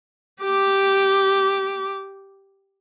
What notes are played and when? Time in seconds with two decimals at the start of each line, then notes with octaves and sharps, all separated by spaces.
0.42 G4 D6